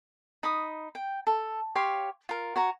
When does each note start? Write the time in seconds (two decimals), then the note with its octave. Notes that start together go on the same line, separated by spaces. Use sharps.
0.43 D#4 B5 D#6
0.95 G5
1.27 A4
1.75 G4 C#5 F5 C6
2.29 F4 A#4
2.56 F#4 C#5 A#5